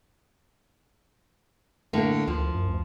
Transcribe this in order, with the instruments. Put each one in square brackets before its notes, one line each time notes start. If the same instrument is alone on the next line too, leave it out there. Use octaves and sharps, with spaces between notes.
[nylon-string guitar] A2 D3 A#3 [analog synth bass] A3
[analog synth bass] D2 [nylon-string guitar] F3
[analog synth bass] F#2
D2